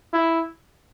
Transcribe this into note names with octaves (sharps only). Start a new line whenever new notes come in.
E4